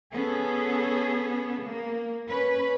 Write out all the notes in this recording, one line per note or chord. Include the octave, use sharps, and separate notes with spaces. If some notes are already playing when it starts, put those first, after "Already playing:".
B3 C#4 G#4 A4
A#3
C#4 B4